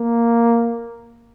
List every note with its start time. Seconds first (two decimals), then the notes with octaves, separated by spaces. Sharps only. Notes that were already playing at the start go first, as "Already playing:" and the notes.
Already playing: A#3